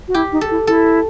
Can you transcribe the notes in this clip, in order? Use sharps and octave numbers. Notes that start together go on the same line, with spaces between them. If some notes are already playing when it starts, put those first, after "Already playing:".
F#4
E4 G4
D#4
A4
E4
E4 A4